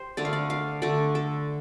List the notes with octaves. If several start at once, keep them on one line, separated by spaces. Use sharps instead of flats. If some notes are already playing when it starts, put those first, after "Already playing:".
Already playing: G4 C5
D3 A3 D5
F5
D5
F5
D3 A3 D5
A4